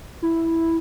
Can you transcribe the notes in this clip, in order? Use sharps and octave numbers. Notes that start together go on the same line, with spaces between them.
E4